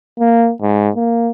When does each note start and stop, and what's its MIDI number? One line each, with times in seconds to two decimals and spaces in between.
0.20 0.52 58
0.62 0.89 44
0.96 1.31 58